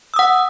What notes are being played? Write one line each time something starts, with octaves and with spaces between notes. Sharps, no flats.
F#5 D#6 E6